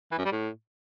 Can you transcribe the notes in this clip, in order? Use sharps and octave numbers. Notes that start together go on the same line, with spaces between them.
E3
F#2
G3
A2